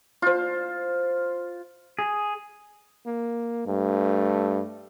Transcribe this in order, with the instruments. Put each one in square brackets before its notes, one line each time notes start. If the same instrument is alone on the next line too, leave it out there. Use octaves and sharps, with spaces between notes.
[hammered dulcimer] F4 C5
[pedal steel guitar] G#4
[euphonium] A#3
[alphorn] G2 [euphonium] A3